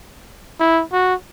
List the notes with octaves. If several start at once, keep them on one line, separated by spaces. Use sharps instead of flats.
E4
F#4